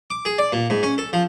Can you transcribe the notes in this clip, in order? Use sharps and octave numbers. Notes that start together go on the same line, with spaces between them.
D6
G#4
D5
A#2
G#2
C#4
A4
F3